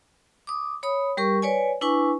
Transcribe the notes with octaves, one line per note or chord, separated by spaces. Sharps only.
D6 D#6
C#5 B5 D#6
G3 G4 A#4 C#6
B4 C#5 D5 G#5
D4 E4 B4 G#5 C#6